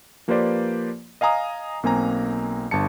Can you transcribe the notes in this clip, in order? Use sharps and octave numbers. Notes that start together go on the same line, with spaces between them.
F3 A#3 G4 B4 C5 D5
D#5 F5 G#5 A#5 D#6
B1 A#3 C4 G#5 A#5
G1 G2 A5 C#7